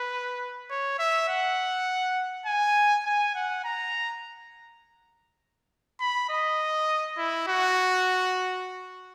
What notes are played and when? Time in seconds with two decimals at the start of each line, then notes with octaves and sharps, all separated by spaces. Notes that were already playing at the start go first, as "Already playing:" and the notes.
Already playing: B4
0.70 C#5
0.99 E5
1.29 F#5
2.46 G#5
3.05 G#5
3.35 F#5
3.64 A#5
6.00 B5
6.30 D#5
7.17 E4
7.48 F#4